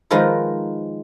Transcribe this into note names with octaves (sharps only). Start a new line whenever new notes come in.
D#3 F3 G#3 A#4 B4